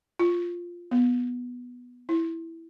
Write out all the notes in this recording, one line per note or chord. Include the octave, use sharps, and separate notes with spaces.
F4
B3
E4